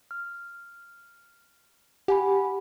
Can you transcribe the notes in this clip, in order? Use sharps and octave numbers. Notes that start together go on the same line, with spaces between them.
F6
G4 F#5 G#5 B5